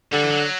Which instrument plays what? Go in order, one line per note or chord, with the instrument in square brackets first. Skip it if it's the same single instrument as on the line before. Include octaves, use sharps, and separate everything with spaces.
[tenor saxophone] D3 [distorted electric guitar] G3
[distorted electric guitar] E3
F#3